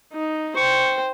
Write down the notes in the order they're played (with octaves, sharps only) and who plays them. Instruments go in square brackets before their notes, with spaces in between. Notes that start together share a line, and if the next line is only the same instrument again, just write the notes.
[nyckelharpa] D#4
[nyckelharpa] C5 G5 [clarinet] C#6